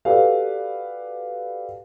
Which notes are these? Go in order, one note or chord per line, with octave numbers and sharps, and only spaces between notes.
F#4 G4 A4 B4 D5 F5